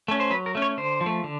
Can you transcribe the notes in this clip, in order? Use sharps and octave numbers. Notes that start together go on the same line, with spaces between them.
A3 C#4
C5
F#3 B4
A#4
A3 C#4
C#5
D3 C5
F3
A3
D3